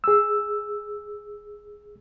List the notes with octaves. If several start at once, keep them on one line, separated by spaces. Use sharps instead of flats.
G#4 E6